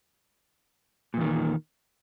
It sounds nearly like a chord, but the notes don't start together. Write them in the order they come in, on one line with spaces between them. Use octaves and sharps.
A#2 E2 D#3